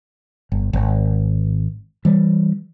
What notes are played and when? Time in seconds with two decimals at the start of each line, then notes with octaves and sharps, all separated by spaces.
0.52 G1
0.73 G#1
2.05 E3 G3